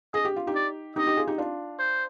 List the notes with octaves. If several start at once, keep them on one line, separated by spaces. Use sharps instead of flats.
G#4 D#5
G4
F4
D#4 G4
D5
D#4 G4 D#5
D#4 G4
F4 G#4
D#4 G4
D4 F4
C5